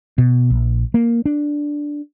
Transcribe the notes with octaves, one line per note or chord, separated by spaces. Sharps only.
B2
A#1
A#3
D4